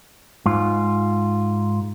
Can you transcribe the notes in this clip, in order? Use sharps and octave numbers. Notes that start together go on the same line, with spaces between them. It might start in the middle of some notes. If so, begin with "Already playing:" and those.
G#2 F4